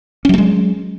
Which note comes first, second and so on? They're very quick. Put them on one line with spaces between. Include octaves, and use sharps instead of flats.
C#4 F#3 A3 G#3